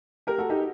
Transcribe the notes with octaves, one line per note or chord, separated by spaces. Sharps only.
G4 A#4
F#4 A4
D#4 G4